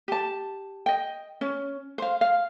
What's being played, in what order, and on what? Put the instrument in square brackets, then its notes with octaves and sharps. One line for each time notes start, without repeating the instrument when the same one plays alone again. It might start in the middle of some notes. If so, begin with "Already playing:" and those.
[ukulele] G4 A5
D#5 G5
C#4
C5 F5
F5